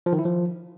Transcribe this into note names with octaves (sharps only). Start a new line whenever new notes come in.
F3
D#3
E4
F3